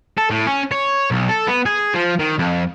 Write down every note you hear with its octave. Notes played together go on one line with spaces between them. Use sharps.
A4
A2
C#4
C#5
B1
A4
B3
G#4
F3
D#3
F2